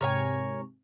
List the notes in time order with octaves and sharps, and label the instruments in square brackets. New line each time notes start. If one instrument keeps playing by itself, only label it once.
[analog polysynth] G#2 C3 [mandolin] A#4 C#5 G#5